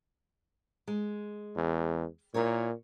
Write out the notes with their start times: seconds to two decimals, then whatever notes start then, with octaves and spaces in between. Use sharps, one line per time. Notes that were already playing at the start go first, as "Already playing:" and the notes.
0.87 G#3
1.56 E2
2.34 A#2 E4 A#4 C#5